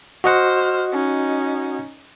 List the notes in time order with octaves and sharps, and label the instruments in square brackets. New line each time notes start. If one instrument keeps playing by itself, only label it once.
[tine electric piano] F#4 D#5 F#5 [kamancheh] C5 F6
[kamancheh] C#4 D#4